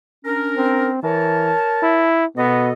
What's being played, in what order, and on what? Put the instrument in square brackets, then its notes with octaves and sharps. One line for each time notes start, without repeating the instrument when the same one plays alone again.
[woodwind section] C#4 D4 A#4
[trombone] C4
[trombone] E3 [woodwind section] A#4 C#5 A5
[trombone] E4
[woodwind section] B2 A4 D#5 [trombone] B3